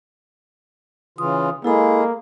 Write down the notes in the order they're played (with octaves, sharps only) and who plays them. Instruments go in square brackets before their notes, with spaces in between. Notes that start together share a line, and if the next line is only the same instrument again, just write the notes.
[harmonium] C#3 E3 F4 [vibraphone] D#6
[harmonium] G#3 G#4 [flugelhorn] A#3 [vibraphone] E4 A4 B5